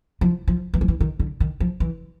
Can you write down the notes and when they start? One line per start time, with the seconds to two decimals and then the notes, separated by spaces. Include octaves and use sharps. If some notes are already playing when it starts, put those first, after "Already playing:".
0.21 F3
0.48 F3
0.74 E3
0.81 F3
0.88 E3
1.00 D#3
1.20 D3
1.40 D#3
1.60 F3
1.80 E3